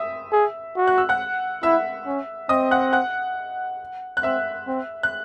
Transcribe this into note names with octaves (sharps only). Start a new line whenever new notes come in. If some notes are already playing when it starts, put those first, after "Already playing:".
Already playing: E5 D#6 E6
G#4
F#4
F#6
E6
F#5 F#6
E4 E5 E6
C#4
C4 D#5 D#6
F#5 F#6
F#5 F#6
F#6
C4 E5 E6
C4
F#6